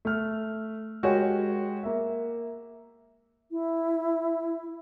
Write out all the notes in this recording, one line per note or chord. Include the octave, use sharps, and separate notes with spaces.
A3 F6
G#3 F#4 G4 A#4 C#5 G5
A#3 E5
E4